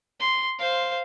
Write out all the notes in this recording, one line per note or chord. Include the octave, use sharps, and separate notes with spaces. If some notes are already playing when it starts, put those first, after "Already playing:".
C6
C5 F5